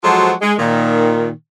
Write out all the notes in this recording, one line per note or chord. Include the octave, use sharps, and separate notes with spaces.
F3 F#3 G#3 F#4 A4 C5
G#3
A#2 D#3